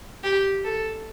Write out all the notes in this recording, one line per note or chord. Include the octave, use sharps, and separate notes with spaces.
G4
A4